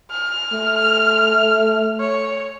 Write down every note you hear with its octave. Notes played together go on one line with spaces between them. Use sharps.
F6
A3
C#5